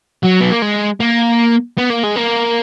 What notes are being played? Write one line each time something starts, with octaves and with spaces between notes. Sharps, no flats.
F#3
B3
A#3
G#3
A#3
B3
A#3
G#3
A#3